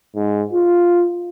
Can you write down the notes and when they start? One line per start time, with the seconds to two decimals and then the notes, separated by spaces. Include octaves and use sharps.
0.16 G#2
0.53 F4